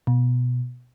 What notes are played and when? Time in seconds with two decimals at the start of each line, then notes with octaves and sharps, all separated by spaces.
0.07 B2